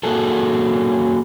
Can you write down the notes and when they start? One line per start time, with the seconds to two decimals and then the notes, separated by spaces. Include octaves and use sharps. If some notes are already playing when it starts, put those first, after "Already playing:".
0.03 A#3 F#4 G#4 A4